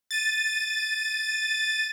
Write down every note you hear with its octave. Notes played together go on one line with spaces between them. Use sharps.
A6 D#7